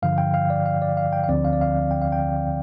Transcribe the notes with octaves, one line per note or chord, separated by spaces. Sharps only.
G2 D3 F3 F5
G5
F5
D5
F5
D5
F5
G5
F5
D2 D3 F3 C4 D5
F5
D5
F5
G5
F5
G5